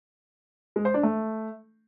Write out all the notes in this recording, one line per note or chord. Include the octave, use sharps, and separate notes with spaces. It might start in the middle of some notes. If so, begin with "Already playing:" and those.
G#3
C5
D4
A3